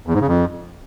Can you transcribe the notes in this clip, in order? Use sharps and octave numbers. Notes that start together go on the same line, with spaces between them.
E2
G#2
C#3
F2